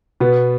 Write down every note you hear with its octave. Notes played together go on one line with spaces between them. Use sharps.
B2 B3